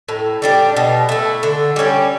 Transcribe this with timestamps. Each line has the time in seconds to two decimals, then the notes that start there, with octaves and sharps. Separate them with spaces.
0.09 A2
0.42 G3 D4 G4
0.77 B2
1.09 A3 E4
1.43 D3
1.76 G3 C#4 G4